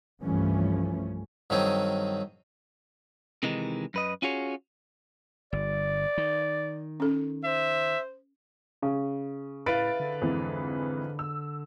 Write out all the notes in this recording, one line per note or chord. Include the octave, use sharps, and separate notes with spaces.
C2 G2 E3 F3 A3 C#4
G2 D#3 F#3 C4 G#4
C3 D#3 E3 G#3 D#4
F#2 B4 D#5
C#4 F4 F#4 G#4 C#5
G1 D5
D#3
C#4 A4
C5 E5
C#3
A2 E4 B4 F5 A6 D7
D3
F2 G#2 E3
E6